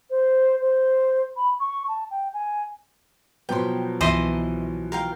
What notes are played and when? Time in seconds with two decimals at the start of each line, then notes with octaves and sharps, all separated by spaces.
0.10 C5
0.61 C5
1.36 B5
1.60 C#6
1.88 A5
2.11 G5
2.34 G#5
3.49 B2 F3 F#3 B4 G5 C6
4.01 C2 E3 B3 C5 D#5 E5 C6
4.92 A#4 F5 G5